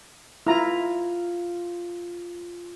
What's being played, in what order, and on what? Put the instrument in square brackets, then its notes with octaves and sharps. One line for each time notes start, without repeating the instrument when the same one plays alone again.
[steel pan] E4 A#5 [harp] F4 F6